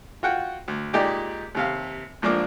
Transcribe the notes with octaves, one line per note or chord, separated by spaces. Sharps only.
F4 F#4 F#5 G5
D2
A#2 G#3 D#4 G4 D5 G5
D#2 C3 F5
A#1 G#2 F3 A#3 D4 D6